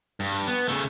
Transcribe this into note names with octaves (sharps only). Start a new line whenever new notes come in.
G2
B3
C#3 A3